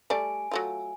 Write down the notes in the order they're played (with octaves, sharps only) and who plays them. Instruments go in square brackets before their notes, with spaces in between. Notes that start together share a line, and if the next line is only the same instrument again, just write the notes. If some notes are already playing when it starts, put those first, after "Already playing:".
[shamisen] G3 A3 D5 [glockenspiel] G#5
[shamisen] F#3 A3 F4